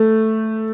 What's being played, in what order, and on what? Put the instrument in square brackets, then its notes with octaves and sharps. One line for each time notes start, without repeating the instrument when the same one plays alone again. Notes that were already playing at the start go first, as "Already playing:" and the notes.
Already playing: [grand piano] A3